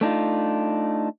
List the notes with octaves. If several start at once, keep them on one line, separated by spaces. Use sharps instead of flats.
A3 D4 D#4 F4